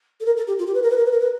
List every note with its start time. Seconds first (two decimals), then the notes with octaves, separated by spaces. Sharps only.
0.20 A4
0.26 A#4
0.37 A4
0.47 G4
0.59 F4
0.67 G4
0.74 B4
0.83 A#4
0.90 B4
0.97 A#4
1.05 B4
1.12 A#4
1.20 B4